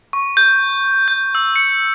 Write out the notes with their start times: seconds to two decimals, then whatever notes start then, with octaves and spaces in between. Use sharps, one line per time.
0.13 C#6
0.37 G6
1.08 G6
1.35 E6
1.56 C#7